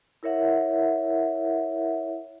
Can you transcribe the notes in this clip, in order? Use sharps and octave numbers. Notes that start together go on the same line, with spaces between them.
E4 A#4 C#5 E5 F#5